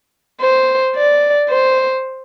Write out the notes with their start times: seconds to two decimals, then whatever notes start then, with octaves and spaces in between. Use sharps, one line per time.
0.41 C5
0.96 D5
1.49 C5